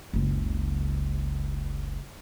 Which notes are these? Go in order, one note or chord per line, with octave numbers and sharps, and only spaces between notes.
F#1 C#2